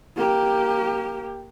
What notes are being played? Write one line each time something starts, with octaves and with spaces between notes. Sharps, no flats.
A#3 G4